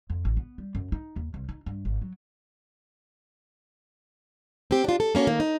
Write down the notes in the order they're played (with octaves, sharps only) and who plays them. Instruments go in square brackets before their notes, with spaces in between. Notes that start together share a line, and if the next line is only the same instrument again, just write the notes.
[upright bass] F2
A1
B3
G3
F#2
D#4
D#2
C2
D#4
G2
G#1
F#3
[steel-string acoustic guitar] C4 G4
D4 F4
A4
A#3 C#4 E4 F#4
D#3 A#3
D#4